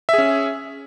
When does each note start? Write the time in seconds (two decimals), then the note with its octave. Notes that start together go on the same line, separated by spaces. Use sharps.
0.09 E5
0.14 G#4
0.18 C#4